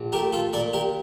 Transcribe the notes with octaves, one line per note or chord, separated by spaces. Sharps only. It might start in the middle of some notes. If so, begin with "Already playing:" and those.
Already playing: A#1
A3 G4 A#4
F4 A4
A#2 A#4 D5
G4 A#4